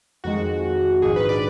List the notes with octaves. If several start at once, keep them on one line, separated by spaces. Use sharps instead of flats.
F2 D#3 G#3 F#4
A#1 G#2 D#3 G#4
B4
D5